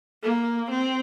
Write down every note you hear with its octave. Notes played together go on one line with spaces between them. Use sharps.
A#3
C4